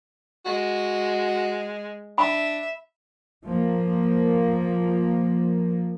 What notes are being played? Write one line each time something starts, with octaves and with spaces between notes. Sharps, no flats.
G#3 F#4
D4 E5 B5
F3 A#3